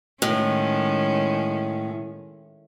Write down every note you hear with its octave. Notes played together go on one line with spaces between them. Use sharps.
A2 D#3 G#3 C#4